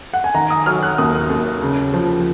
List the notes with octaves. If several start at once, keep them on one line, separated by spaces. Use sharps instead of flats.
F#5
G#5
D#3 A#5
D#6
F#3 F6
F#6
D#2 D#6
D#2
C#3
F3